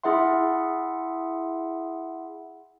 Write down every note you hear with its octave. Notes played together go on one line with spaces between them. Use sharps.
E4 G#4 E5 F#5 C6